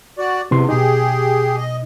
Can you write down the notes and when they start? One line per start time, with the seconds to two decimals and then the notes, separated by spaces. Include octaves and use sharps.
0.18 F#4 D5
0.51 E2 C3 E3 C6
0.69 B2 D#4 G4 G#4
1.58 D#5